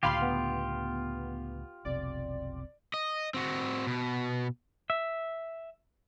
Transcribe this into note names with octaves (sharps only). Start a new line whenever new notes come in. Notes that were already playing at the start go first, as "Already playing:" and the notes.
C#2 A2 D3 F4 G4 F5 B5 C6
B3
F1 B1 C3 D5
D#5
C4 F#4
B2
E5